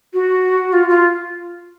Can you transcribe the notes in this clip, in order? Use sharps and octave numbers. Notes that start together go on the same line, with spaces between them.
F#4
F4
F4